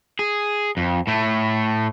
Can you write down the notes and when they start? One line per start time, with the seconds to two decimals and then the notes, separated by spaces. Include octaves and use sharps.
0.19 G#4
0.77 F2
1.07 A2 A3